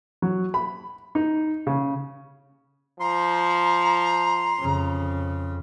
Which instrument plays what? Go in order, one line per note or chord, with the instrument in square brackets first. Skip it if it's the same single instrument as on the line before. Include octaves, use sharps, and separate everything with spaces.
[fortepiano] F#3
B5
D#4
C#3
[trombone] F3 [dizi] A#5 [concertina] C6
[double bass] F2 C#3